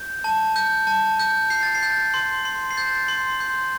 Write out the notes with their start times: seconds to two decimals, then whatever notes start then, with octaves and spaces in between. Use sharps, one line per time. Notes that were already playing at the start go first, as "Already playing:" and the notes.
Already playing: G6
0.24 A5
0.56 G6
0.87 A5
1.20 G6
1.50 G6 C7
1.63 A6
1.75 C7
1.83 G6
2.14 C6
2.45 C6
2.71 C7
2.77 G6 A6
3.08 C6
3.40 C6 G6